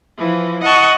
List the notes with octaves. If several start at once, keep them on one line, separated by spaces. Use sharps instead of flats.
E3 F3
D#5 F#5 A5 C#6